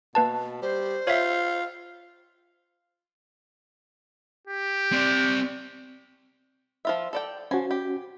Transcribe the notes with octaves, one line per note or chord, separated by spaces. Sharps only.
B2 A#3 B4 A5
G3 C5
F4 C#5 E5
G4
C4 D5
F3 F4 E5
A4 D5 G5
F3 C#4 F#4 G#5
G4